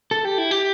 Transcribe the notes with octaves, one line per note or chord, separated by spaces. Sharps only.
A4
G4
E4
G4